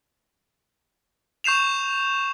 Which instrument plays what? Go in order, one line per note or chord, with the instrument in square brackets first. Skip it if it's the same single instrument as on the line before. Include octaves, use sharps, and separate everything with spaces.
[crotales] C#6 G6 C7 E7 F7